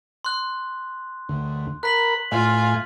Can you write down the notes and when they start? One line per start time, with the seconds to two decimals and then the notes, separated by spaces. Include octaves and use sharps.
0.25 C6 F#6
1.29 D2
1.83 A#4 B5 F#6 B6 F#7
2.32 A2 F4 F5 G#5